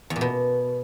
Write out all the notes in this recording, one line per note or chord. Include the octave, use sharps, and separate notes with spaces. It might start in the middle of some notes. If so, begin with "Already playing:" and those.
E2
A#2
B2